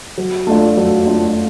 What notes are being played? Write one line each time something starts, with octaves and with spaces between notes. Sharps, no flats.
F#3
A3 D4 F4
F#3
A3 D4 F4